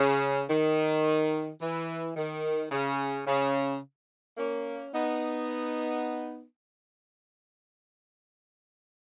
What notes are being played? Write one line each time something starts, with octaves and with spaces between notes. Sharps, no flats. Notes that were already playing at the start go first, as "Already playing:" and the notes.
Already playing: C#3
D#3
E3
D#3
C#3
C#3
A#3 C#4
B3 D#4